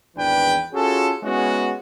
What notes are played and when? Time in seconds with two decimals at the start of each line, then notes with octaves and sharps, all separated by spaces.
0.16 G#1 E2 E3 D4 B4 G5
0.72 C#4 F4 F#4 G#4 A4
1.23 G#3 B3 C#4 E4 F#4